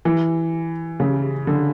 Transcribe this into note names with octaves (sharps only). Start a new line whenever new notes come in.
E3
C#3
D3